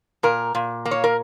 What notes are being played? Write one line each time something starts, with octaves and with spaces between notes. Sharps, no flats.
A#2 A#4
A#2
A#3
C#5
A#4